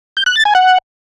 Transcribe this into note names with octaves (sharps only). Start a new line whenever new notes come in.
G6
F#6
A6
G#5
F#5